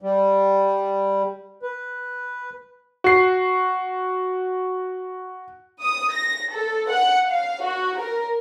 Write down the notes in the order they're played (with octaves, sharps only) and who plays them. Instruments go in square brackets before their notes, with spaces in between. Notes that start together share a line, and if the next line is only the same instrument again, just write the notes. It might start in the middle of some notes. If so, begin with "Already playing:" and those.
[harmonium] G3
B4
[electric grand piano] F#4 C7
[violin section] D#6
A#6
A4
F#5
F5
F#4
A#4